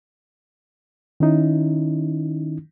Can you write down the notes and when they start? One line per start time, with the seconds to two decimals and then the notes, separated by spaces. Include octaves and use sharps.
1.20 D#3 C#4 D#4 E4